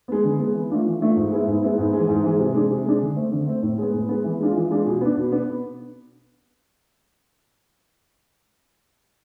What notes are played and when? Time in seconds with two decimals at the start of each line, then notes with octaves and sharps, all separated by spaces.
0.08 G#3 B3
0.24 D3
0.39 G#3 B3
0.54 E3
0.70 A3 D4 F4
0.85 E3
1.00 A3 D4 F4
1.16 G#2
1.32 G#3 B3 E4
1.46 G#2
1.62 G#3 B3 E4
1.78 G#2
1.93 E3 G#3
2.09 G#2
2.24 E3 G#3
2.39 C3
2.54 G#3 D4
2.71 C3
2.86 G#3 D4
3.01 D3
3.16 A3 C4
3.32 D3
3.48 A3 C4
3.63 A2
3.78 G#3 B3
3.94 A2
4.09 G#3 B3
4.24 E3
4.40 G#3 D4 F4
4.55 E3
4.71 G#3 D4 F4
4.86 B2
5.01 B3 D4
5.17 B2
5.32 B3 D4